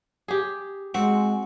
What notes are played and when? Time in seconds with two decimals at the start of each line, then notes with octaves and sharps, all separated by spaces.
0.28 G4 G#4
0.94 G#3 C4 F#4